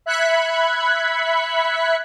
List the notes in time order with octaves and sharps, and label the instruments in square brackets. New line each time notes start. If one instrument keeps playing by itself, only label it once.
[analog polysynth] E5 B5 F#6 G#6 B6 C#7